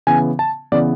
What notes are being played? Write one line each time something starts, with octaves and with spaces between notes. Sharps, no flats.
C#3 E3 B3 G#5
A5
C#3 E3 B3 D5